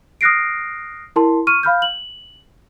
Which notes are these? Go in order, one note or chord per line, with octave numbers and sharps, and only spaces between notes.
D#6 F6 F#6 A#6 C7 D7
E4 A#4 A5 C6
C#6 F6 D#7
F5 B5 F6 G6
F#7